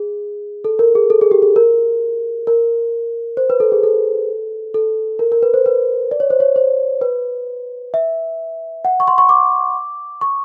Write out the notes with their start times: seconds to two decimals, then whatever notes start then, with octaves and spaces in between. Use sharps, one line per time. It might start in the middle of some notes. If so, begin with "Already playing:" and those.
Already playing: G#4
0.64 A4
0.79 A#4
0.95 G#4
1.10 A4
1.21 G#4
1.31 G4
1.42 G#4
1.56 A#4
2.47 A#4
3.37 C5
3.50 B4
3.60 A4
3.72 G#4
3.83 A4
4.74 A4
5.19 A#4
5.32 A#4
5.43 B4
5.54 C5
5.66 B4
6.11 D5
6.20 C#5
6.30 C5
6.40 C#5
6.56 C5
7.01 B4
7.94 E5
8.85 F#5
9.00 C#6
9.08 C6
9.18 C#6
9.29 D6
10.21 C#6